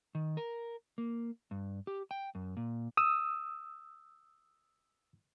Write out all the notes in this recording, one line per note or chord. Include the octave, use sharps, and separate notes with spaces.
D#3
A#4
A#3
G2
G4
G5
F#2
A#2
D#6 E6